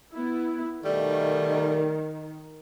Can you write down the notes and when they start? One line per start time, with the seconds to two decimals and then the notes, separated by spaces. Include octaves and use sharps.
0.13 B3 E4
0.85 B2 D#3 G3 A3